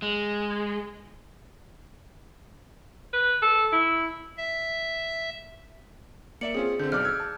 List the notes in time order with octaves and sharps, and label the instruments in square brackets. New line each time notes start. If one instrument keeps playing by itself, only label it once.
[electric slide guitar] G#3
[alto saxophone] B4
A4
E4
[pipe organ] E5
[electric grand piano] A#3 D5 E5 [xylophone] C#7 F#7
[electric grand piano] C4 C#4 F4 [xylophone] G#4
[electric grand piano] D3 C4 [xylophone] G6
[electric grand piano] B1 D5 D6 [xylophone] F6 F#6 C#7
[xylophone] E6 G6 [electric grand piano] G#6
[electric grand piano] A5